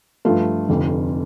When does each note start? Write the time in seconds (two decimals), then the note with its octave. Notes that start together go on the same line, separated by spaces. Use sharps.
0.25 G2 F3 A3 F4
0.69 F1 F2 D3